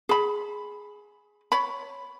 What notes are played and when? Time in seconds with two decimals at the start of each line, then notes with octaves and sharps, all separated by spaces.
0.09 G#4 B5
1.52 C#5 B5